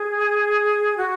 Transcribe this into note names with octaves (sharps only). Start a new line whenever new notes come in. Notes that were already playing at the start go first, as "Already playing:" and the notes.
Already playing: G#4
F#4